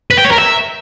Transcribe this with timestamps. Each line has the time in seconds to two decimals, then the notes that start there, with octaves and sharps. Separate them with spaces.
0.11 B4
0.18 G5
0.25 C#5
0.32 A#4
0.39 E5